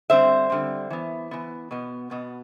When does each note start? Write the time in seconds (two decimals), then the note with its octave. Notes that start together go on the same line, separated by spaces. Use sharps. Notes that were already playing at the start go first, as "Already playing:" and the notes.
0.10 D3 G3 C4 C5 E5
0.50 D3 G3 C4
0.90 E3 B3
1.31 E3 B3
1.71 B2 B3
2.11 B2 B3